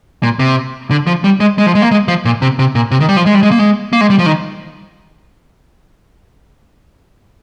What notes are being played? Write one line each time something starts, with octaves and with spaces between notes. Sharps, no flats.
A#2
C3
D3
F3
G3
G#3
G#3
F3
G#3
A#3
G#3
F3
A#2
C3
C3
A#2
C3
D#3
G3
F3
G#3
G3
G#3
A#3
G#3
A#3
G#3
G3
F3
D#3